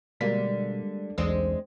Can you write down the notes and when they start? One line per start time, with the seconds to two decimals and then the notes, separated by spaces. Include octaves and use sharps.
0.21 B2 D3 G3 G#3 A#3 D4 B6
1.18 B1 E2 G#3 C4 D4